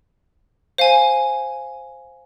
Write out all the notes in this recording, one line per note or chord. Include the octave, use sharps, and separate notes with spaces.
C5 F5 G#5